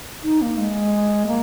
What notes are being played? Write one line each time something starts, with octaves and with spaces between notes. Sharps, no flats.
D#4
A#3
G#3
A#3